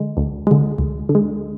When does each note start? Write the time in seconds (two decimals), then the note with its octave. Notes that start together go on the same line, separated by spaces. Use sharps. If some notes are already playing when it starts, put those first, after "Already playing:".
Already playing: D3 G#3
0.17 D2
0.47 D3 G#3
0.78 D2
1.09 D3
1.15 G#3